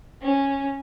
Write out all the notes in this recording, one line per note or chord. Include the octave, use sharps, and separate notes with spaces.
C#4